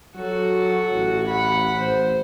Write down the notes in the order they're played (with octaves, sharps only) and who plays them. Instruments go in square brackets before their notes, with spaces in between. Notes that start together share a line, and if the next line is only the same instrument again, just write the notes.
[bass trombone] F#3 [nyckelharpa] F#4 A4
[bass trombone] A1
[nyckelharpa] F#5 B5
[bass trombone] A1 [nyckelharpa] C5